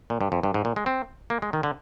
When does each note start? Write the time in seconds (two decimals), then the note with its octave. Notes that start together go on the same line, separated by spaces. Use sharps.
0.10 A#2
0.21 G2
0.32 F2
0.43 G2
0.54 G#2
0.65 A#2
0.76 G#3
0.86 C4
1.30 A#3
1.42 G#3
1.53 D#3
1.63 D3